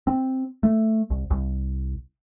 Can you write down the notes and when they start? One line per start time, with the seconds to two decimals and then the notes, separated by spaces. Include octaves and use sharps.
0.07 C4
0.63 A3
1.10 C2
1.30 C2